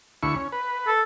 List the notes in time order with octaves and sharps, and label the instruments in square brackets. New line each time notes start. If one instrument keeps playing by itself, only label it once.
[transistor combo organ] D2 E4 C#6
C#4
B4
[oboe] A4